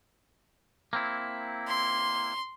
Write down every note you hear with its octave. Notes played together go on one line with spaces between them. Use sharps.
A#3 C4 E4
C6